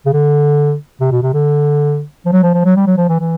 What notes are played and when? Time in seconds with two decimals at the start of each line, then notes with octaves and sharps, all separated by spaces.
0.06 C#3
0.13 D3
1.01 C3
1.12 B2
1.23 C3
1.34 D3
2.25 F3
2.32 F#3
2.43 F3
2.54 F3
2.65 F#3
2.76 G3
2.87 F#3
2.97 F3
3.09 E3
3.20 E3